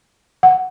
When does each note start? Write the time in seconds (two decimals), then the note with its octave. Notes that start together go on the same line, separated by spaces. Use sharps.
0.43 F#5